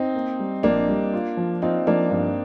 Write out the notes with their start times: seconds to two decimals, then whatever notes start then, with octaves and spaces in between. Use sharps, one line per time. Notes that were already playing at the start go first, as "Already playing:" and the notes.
Already playing: C4 D#4
0.14 A#3
0.39 G3
0.63 A#1 A#3 D4
0.88 G3
1.14 F4
1.37 F3
1.62 C4 D#4 F4
1.87 F3 A#3 D4
2.11 G2